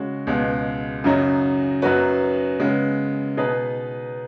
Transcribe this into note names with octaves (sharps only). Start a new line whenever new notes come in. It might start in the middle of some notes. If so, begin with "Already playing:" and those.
Already playing: C#3 G#3 C#4 F#4
C#2 B2 G#3 B3
F#2 C#3 F#3 D#4 F#4
F#2 F#3 D#4 F#4 B4
C#3 G#3 B3
B2 B3 D#4 G#4 B4